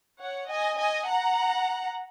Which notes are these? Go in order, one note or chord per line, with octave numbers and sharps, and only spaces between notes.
C#5 F#5
D#5 G#5
D#5 G#5
F#5 A#5